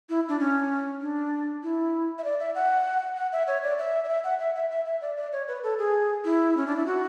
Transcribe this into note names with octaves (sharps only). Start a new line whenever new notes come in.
E4
D4
C#4
D4
E4
E5
D5
E5
F#5
F#5
E5
C#5
D5
E5
D5
E5
F#5
E5
E5
E5
E5
D5
D5
C#5
B4
A4
G#4
E4
C#4
D4
E4
F#4